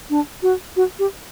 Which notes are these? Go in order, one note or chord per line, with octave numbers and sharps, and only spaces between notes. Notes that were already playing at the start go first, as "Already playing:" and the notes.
D4
F#4
F#4
G4